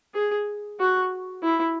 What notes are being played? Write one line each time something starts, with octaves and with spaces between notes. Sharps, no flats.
G#4
F#4
E4